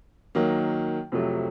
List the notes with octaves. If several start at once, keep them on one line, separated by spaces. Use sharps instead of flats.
D#3 F#3 A#3
F2 C3 F#3 A3